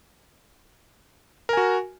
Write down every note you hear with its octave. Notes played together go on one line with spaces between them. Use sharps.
F#4 A#4 G#5